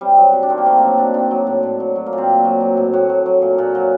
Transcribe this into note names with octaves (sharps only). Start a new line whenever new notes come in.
C3 G3
F#3
C3
D4
D#3 C4
A#3
C3 A3
A#3
F#3 C4 D4
C3 D4
D#3 D4
F#3
A2
A2
F#3
F#3
A#3
A#2
C4
A#2
F#3
F#3
A2
A2 F#4
F#3
F#3
A#2
A#2 F#4
F#3